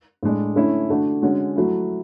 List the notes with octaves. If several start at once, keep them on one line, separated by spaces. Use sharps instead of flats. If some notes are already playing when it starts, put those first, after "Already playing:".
A2 G#3 D4
D3 A3 C#4 E4
D3 A3 D4 F#4
D3 G#3 C#4 F#4
F#3 A3 E4